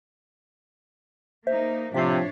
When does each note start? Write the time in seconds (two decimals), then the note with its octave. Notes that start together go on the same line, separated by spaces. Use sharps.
1.47 A#3 D#4 C5 E5
1.94 A2 C3 F3 D4 C#5 E5 B6 C7